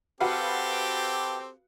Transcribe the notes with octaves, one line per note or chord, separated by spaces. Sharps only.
C4 F#4 G4 A4 B4 F5